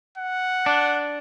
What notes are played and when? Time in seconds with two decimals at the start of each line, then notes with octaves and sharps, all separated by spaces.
0.18 F#5
0.66 D4